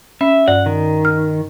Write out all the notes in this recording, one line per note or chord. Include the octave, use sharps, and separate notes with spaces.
C#4 E5
G2 D5 F#5
D#3
F6